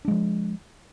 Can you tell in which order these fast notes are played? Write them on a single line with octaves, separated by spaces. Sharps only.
D4 G#3 F3